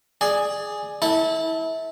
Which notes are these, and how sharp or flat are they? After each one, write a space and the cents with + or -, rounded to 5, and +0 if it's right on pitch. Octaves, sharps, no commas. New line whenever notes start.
G#4 +0 D5 +20
E4 -30 A4 +0